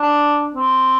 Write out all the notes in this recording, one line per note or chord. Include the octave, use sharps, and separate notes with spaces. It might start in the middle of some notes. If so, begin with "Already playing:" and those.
Already playing: D4
C4